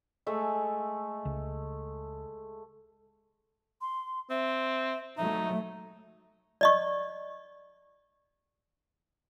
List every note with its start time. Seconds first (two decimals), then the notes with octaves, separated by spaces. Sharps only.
0.27 G#3 A3 E5
1.25 C#2
3.81 C6
4.30 C4 E5
5.17 F#3 A3 D#4 E5
6.61 D5 D#5 C#6